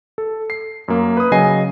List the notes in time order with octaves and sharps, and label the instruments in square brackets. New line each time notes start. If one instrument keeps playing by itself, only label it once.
[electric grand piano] A4
C7
F#2 A#3
B4 D#6
C#3 F#3 D#5 G#5 C7